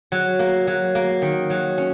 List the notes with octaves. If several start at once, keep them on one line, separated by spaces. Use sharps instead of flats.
F#3
A#3
F#3
A#3
D#3
F#3
C#4